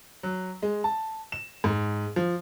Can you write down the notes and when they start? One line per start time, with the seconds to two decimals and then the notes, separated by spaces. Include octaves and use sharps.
0.23 F#3
0.62 G#3
0.84 A5
1.32 E7
1.64 G#2
2.16 F3